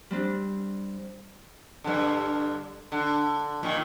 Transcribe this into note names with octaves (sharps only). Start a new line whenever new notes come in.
G3 C4 D4
G2 D3
D3
A#2 D#3